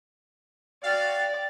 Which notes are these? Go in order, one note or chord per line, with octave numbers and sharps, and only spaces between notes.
F#4 D5 F5 G5 A6